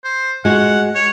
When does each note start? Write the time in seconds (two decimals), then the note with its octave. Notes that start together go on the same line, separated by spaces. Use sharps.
0.04 C5
0.45 G#3 F#4 F#5
0.95 C#5